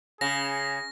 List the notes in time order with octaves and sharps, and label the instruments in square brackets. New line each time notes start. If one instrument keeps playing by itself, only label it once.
[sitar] C#3 [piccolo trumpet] G#4 [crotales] A#6